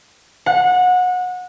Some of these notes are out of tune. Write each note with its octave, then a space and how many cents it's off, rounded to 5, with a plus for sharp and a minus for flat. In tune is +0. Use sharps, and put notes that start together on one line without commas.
F#5 -25